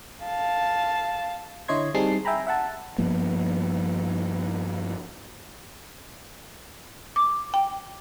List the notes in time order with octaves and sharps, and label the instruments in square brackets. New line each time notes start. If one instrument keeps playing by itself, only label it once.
[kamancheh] F5 A5
[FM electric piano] D3 E4 C#5 D#5 C6 G#6
G3 C4 D#4 G#4 A5 C7
E5 G5 G#5 A#5 B5
E5 F#5 A5
[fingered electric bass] G2 F3 A#3 B3
[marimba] D6
G5